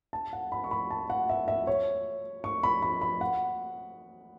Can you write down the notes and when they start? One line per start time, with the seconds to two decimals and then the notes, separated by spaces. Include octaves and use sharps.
0.13 A5
0.33 F#5
0.52 B5
0.64 C#6
0.71 B5
0.91 A5
1.10 F#5
1.29 E5
1.48 E5
1.67 C#5
2.44 C#6
2.63 B5
2.82 B5
3.01 B5
3.21 F#5